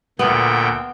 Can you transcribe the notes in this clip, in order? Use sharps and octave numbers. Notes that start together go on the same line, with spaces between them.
D2 A#2 B3 G5